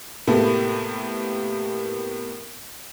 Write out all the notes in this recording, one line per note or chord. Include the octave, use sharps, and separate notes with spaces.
A2 C3 A#3 B3 E4 A4